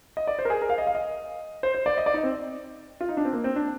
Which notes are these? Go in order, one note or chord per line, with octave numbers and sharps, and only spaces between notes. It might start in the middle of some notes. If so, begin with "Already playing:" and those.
D#5
D5
C5
A#4
G#4
A#4
F5
D#5
F5
D#5
C5
C5
D5
D#5
D5
D#4
C4
F4
D#4
D4
C4
A#3
C4
D4